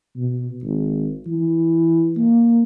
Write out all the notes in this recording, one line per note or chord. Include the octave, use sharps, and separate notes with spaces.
B2
G#1
E3
A#3